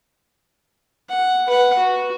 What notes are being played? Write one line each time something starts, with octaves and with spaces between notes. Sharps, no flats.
F#5
B4 F#5
F#4